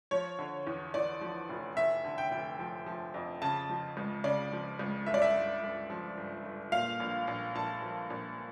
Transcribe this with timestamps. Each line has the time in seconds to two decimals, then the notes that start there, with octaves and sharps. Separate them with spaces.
0.11 F3 C#5
0.39 D3
0.67 E2
0.94 E2 D5
1.21 F3
1.49 F1
1.76 F1 E5
2.04 D3
2.18 G5
2.32 F1
2.59 F3
2.86 F3
3.14 F2
3.42 C#3 A5
3.69 F3
3.97 C#2
4.24 C#3 D5
4.52 F3
4.79 C#2
5.06 G1 E5
5.14 D5
5.22 E5
5.35 G1
5.62 G1
5.90 F3
6.17 G1
6.45 G1
6.72 A#2 F5
7.00 A#1
7.27 A#1
7.55 A#1 A5
7.82 F3
8.10 A#1